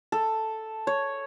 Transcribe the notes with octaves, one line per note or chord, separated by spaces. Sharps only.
A4
C#5